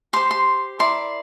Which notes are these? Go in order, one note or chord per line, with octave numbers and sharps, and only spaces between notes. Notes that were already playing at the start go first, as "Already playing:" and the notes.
G4 C5 C6
C6
E4 A#4 D5 C6